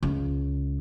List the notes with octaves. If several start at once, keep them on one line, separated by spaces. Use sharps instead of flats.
C#2